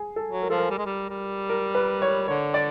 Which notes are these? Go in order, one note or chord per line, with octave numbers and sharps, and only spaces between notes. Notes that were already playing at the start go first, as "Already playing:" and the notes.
Already playing: G#4
A4
F#3
A#4
F3 A4
A#4
G3
G#3
G3
G3
A#4
B4
C#5
D3 C#5
D5